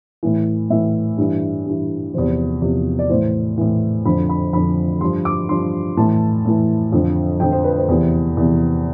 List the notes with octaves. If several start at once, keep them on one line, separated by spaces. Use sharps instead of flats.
A2 E3
A2 E3 E5
G2 E3
G2 E3
E2 C3 F3 C5
E2 C3 F3
D5
A2 E3 C5
A2 E3
F2 D3 F3 B5
B5
F2 D3 F3 B5
G2 F3 C6
D6
G2 F3 C6
A2 E3 A5
A2 E3
F2 D3 F3
F2 D3 F3 G5
C5
B4
C5
E2 C3 E3
E2 C3 E3